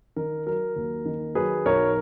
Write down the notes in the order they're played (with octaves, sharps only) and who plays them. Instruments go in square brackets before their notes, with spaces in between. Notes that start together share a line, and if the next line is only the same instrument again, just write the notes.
[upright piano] D#3 A#4
F#3 A#4
D#2
D#3
F#3 G#4 B4
B1 A#4 C#5